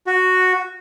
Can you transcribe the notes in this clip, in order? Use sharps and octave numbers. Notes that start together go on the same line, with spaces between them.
F#4